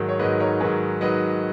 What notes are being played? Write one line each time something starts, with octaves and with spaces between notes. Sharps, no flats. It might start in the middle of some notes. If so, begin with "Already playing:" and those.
Already playing: G#2 D#3 F#3
C#5
G#2 D#3 F#3 B4 D#5
A#4 C#5
G#2 D#3 F#3 G#4 B4
G#2 D#3 F#3 B4 D#5